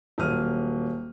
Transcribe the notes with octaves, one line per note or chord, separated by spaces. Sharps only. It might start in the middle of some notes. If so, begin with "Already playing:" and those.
D#1 F#3 A#3 F6 D#7